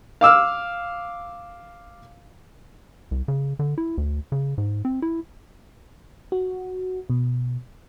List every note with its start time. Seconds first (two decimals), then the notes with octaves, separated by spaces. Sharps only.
0.21 F5 D6 E6 F6
3.11 C2
3.28 C#3
3.59 D3
3.78 E4
3.98 D2
4.32 C#3
4.58 G#2
4.85 C4
5.02 E4
6.32 F#4
7.10 B2